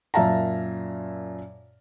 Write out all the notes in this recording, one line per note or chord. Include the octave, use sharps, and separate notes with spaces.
F#2 A#2 E5 F5 A5 A#5